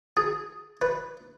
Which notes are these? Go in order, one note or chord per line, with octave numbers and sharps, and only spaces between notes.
G#4
B4